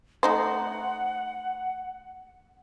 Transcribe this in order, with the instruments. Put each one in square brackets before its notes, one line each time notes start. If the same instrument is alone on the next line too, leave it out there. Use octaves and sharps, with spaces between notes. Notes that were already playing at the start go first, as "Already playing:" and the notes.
[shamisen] A3 D#4 C5 [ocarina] F#5